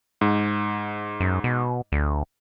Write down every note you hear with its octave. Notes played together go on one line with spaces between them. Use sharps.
G#2
F#2
B2
D2